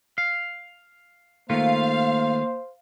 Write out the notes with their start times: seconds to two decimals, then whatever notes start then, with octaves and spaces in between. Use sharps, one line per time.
0.18 F5
1.50 D#3 A3 A#3 F4 C5 F5